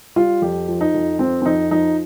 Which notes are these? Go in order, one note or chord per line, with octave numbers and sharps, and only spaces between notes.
G3 F4
F2 G4
F3
D#4
F2
F3 C4
C4
F2 D#4
F3 D#4